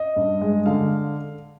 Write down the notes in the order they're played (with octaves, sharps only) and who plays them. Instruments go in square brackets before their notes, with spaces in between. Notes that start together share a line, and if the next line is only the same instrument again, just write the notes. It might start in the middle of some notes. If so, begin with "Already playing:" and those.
Already playing: [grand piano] D#5
G2
G#3
D3 F5